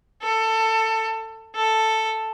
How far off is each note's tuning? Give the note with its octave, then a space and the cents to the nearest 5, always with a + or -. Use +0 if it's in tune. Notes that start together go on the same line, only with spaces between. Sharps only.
A4 +20
A4 +5